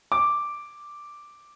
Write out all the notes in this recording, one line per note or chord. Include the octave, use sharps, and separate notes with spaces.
D6